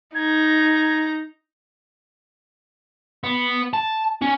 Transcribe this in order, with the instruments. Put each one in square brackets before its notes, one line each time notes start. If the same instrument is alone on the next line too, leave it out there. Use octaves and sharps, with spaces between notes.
[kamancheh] D#4 A#5 [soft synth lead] G#6
[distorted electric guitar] B3
A5
C#4